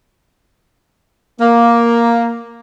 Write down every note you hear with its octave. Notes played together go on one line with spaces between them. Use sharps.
A#3